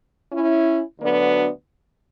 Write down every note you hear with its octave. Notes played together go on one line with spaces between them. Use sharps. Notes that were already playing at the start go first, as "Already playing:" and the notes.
C#4 E4
D2 D3 F#3 B3 D4